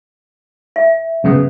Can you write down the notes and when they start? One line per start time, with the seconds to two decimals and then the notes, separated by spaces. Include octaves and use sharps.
0.76 E5
1.24 F#2 C#3 B3